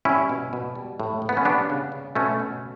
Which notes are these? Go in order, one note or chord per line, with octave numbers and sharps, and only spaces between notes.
G3 C#4 E4
B2
B2
G3
A2
A2
B3
C#4
G3 B3 D4
C#3
C#3
B2 A3 C#4
B2